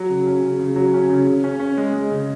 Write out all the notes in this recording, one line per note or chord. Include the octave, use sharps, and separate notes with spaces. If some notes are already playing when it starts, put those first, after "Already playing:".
Already playing: F#3
C#3
C#4
C#3
C#3
F#3
C#4
C#3
C#3
C#4
C#4
G#3
G#3
C#3